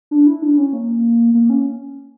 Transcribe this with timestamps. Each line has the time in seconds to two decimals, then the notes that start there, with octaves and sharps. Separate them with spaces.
0.11 D4
0.27 E4
0.42 D4
0.58 C#4
0.73 A#3
1.34 A#3
1.50 C#4